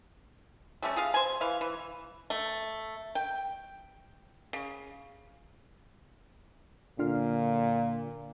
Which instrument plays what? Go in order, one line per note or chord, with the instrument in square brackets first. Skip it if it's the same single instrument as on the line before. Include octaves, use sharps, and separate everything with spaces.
[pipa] G3 A3 C#4
F4 G#4 F5
C5 G#5
E3 F5
E3
A3
G5
C#3
[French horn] A#2 [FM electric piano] D3 F4 F5